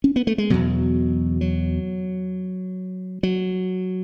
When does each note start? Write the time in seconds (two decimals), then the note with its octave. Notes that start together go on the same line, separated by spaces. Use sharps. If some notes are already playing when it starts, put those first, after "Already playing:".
0.04 C#4
0.16 B3
0.27 A3
0.38 G#3
0.50 E2 B2 F#3
1.41 F#3
3.23 F#3